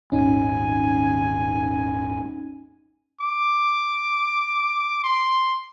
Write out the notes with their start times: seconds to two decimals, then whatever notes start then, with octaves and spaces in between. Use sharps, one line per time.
0.12 D#1 G#1 C#4 D#4 G#5
3.21 D6
5.04 C6